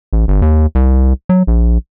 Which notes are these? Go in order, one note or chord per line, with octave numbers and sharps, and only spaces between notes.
A1
G1
D#2
C2
F#3
A#1